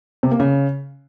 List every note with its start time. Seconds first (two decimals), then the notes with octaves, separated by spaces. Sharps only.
0.23 C3
0.31 A#3
0.40 C#3